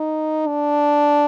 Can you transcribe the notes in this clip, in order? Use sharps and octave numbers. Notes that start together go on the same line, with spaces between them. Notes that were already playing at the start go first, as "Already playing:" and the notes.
Already playing: D#4
D4